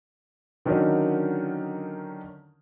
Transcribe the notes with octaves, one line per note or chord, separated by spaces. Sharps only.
D3 D#3 F#3 C#4 D#4 A#4